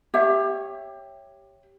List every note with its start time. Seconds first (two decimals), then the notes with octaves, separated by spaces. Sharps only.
0.14 G4 C#5 E5